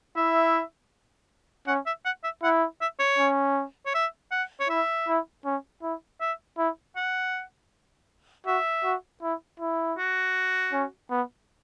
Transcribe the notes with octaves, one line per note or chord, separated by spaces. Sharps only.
E4 E5
C#4 F#5
E5
F#5
E5
E4 F#5
E5
C#5
C#4
C#5
E5
F#5
C#5
E4 E5
E4
C#4
E4
E5
E4
F#5
F#4 E5
F#4
E4
E4
F#4
C#4
B3